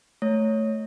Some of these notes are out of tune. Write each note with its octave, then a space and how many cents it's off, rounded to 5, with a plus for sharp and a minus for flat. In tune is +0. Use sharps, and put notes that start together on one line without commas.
A3 +0 C#5 +5